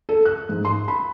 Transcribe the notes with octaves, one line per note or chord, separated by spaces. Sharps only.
A4
F#6
G#2
C6
B5